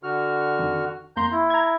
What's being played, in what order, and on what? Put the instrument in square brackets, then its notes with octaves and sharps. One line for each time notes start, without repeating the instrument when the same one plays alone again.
[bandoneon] D3 F#4 F6
[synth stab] F2 D#3
[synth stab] F2 A#3 C6 [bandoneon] A#5 G6
[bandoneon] E4
[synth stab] A#5 G#6